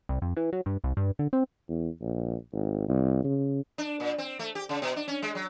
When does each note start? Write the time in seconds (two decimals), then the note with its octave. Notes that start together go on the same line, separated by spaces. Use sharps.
0.09 C2
0.22 F2
0.37 E3
0.53 F#3
0.66 G2
0.84 C2
0.97 G2
1.19 D3
1.33 C4
1.69 E2
2.01 A#1
2.52 G#1
2.88 C2
3.24 C#3
3.78 D4
4.00 A#2
4.18 C4
4.39 A3
4.55 G4
4.69 C#3
4.82 B2
4.96 D4
5.08 C#4
5.22 G#3
5.35 F#3